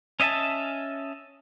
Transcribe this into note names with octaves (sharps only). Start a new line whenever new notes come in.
C#4 D#5 E5 G#5 A5